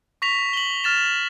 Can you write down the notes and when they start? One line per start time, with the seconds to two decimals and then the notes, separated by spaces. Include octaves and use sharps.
0.22 C#6 A#6 B6 F7
0.53 F#7 G7
0.84 F6 A6 E7